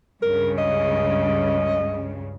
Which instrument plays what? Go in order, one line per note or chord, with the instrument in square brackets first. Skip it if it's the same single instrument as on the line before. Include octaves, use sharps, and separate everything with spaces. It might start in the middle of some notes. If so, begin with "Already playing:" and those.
[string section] C#2 G2 C#3 [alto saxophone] A#4
[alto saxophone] D#5